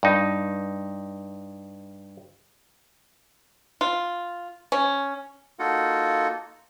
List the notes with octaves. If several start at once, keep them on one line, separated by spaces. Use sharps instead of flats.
G2 D#4
F4
C#4
A#3 D#4 F4 F#4 A4 F#5